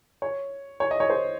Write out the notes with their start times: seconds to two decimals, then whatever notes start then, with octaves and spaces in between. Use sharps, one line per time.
0.22 C#5
0.80 C#5
0.91 D#5
1.00 C#5
1.10 C5